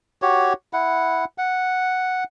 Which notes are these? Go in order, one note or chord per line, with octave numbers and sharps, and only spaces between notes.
F#4 G4 C#5
E4 F#5
F#5